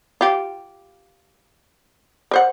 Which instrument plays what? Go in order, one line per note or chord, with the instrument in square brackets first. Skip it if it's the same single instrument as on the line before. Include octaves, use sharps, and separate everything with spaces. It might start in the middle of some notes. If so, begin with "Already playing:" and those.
[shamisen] F4 G4
A#4 C5 F#5